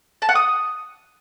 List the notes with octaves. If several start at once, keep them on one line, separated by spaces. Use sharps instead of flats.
A5
F#5
D#6